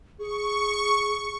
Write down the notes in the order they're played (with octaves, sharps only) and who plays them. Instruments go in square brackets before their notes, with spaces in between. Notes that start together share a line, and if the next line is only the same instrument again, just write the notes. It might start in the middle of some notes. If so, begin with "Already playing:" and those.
[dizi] G#4 [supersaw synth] C#6